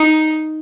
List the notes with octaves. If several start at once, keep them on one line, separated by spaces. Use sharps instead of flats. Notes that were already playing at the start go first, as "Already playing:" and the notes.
Already playing: D#4